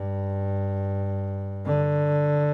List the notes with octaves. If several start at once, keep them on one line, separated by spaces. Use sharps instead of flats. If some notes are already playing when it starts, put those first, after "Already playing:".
Already playing: G2
D3